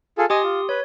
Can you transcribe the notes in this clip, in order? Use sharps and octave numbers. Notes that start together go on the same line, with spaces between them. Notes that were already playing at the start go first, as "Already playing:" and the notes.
F4 G#4 A4
G4 D#5 G#5 C6 D#6
F4
B4 C#5